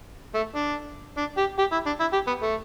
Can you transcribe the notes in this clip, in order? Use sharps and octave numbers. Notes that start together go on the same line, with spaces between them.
A3
D4
D4
G4
G4
E4
D4
E4
G4
B3
A3